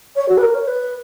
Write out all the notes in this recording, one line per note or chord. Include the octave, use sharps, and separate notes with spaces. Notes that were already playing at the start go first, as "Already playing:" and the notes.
C#5
F#4
B4
A#4
C#5
B4